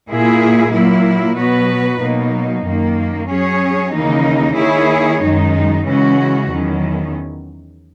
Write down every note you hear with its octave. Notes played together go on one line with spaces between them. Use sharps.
A#2 A#3 E4 G#4
A#2 F#3 A#3 E4
B2 F#3 B3 F#4 B4
B2 F#3 A#3 D#4
F#2 D#3 A#3
F#3 C#4 G#4 C#5
D#2 C#3 E3 A#3 D#4
D#3 A#3 E4 G#4 C#5
F#2 D#3 G#3 D#4
C#3 E3 G#3 C#4 F#4
E2 D#3 F#3 C#4